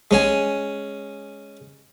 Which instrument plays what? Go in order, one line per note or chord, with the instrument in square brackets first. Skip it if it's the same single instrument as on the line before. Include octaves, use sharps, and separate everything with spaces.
[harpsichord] G#3 C#4 G#5